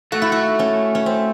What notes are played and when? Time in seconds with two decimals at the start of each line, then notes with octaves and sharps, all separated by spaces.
0.12 A3 F#4
0.22 E4
0.32 F#4
0.59 C#4
0.95 C#4
1.06 C4